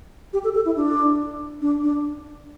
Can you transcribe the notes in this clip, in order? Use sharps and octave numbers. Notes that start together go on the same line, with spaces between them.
G4
A4
A4
E4
D4
D4
D4